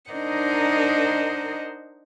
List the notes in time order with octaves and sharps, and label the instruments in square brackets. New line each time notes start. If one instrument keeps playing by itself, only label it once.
[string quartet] D4 D#4 A#4 C5 D#5 F#5